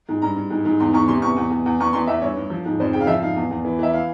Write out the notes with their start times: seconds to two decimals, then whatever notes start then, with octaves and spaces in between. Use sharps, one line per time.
0.09 G#2
0.22 G2 A#5
0.36 G2
0.50 G#2
0.65 G#2
0.80 E2 C6
0.93 E2 C#6
1.08 C3 C6
1.22 E2 C#6
1.36 E2
1.51 E2
1.66 E2
1.80 E2 C#6
1.93 E2 C6
2.07 E2 E5
2.22 G2 C#5
2.37 G2
2.50 F3
2.66 G#2
2.80 F2 C5
2.93 C#3 G5
3.00 F5
3.07 F3 E5
3.21 G#2 F5
3.36 E2
3.51 E2
3.65 E3
3.79 E3 E5
3.93 F5